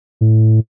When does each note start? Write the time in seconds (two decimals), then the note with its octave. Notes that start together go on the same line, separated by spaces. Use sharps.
0.21 A2